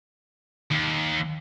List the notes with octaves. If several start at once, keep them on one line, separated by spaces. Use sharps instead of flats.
D#2